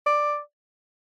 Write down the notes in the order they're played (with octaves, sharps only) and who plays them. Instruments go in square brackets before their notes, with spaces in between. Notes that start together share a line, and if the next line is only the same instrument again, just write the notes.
[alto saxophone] D5